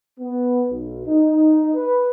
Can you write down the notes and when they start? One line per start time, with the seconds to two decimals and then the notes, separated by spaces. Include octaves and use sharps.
0.20 B3
0.70 B1
1.07 D#4
1.75 B4